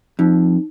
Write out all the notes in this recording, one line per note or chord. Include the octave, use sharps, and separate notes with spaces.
F2 D#4